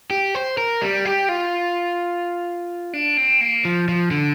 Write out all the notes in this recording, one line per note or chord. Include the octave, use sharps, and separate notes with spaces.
G4
C5
A#4
G3
G4
F4
D4
C4
A#3
F3
F3
D3